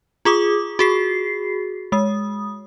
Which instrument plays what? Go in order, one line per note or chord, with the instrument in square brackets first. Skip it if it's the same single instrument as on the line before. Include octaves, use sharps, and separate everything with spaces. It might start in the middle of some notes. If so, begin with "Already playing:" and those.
[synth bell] F4 G#4 D6 D#6
F#4 G#4 C7
G#3 D#6